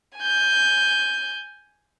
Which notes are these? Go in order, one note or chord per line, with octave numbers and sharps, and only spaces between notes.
G#5 G6